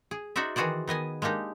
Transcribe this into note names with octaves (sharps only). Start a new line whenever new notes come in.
G#4
D#4 F#4 C5 D5 E5
D#3 E3 F#4 G#4 C5 D5
D#3 B3 D#5 G#5
G#3 A#3 D4 D#4 G4